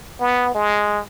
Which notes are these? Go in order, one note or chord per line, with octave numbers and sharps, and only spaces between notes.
B3
G#3